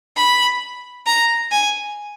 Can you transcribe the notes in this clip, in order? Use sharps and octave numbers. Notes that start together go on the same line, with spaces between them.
B5
A#5
G#5